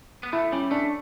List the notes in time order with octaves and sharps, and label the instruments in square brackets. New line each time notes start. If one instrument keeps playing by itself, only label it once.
[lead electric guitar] B3
[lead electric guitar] A3 [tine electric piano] E4
[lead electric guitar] G3 [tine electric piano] C#4
[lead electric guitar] A3 [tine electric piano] D4